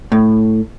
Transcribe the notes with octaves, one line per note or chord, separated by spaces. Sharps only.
A2